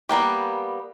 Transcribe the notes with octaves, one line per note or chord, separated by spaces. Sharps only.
G3 A#3 B3 G4